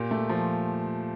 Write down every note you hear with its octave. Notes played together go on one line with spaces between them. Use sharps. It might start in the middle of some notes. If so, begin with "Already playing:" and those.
Already playing: A#2 G4 A#4
A3
F3